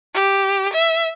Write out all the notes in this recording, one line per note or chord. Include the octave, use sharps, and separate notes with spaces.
G4
E5